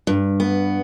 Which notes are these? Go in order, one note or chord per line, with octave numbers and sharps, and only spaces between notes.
G2
B3